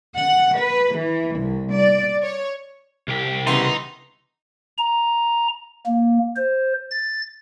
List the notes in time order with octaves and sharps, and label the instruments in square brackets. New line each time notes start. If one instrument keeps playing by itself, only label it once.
[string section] F#5
B4
E3
C2
D5
C#5
[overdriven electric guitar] C2 G4
[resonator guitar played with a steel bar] C#3 E3 B3 [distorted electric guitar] D#4 [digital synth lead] C6
[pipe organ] A#5
A#3
C5
A6